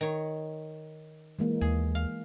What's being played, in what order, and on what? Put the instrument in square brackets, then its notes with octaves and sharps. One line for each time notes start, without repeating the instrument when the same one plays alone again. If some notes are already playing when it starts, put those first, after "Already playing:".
[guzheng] D#3 C#5
[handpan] E3 G#3 A#3
[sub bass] D#2 [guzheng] G#4
[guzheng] F5